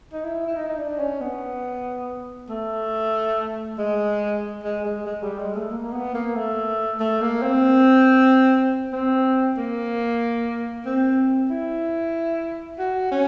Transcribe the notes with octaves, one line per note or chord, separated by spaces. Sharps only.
D#4
E4
E4
D#4
D#4
D4
C#4
B3
A3
G#3
G#3
G#3
G#3
G3
G#3
A3
A#3
B3
A#3
A3
A3
A#3
C4
C4
A#3
C4
E4
F#4
C#4